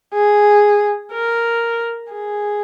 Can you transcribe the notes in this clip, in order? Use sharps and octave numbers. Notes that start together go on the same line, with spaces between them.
G#4
A#4
G#4